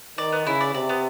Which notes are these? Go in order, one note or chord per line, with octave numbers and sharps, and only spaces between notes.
D#3 D5
B3
C#3 E4
D5
C3 D5
B3